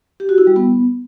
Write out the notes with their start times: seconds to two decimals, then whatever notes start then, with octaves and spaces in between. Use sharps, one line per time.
0.20 G4
0.29 F#4
0.38 E4
0.47 G3
0.56 B3